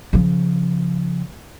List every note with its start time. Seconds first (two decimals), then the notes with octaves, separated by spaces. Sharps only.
0.13 C#3 F3